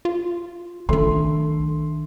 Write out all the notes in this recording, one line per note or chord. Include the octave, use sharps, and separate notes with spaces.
F4
B1 D#3 A3 D4 C6